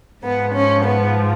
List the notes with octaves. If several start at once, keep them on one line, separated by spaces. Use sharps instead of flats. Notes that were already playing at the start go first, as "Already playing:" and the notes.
G#2 F3 B3
C#4
B3